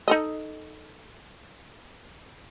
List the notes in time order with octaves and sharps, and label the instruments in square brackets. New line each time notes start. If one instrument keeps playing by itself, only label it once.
[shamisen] D#4 A4 D#5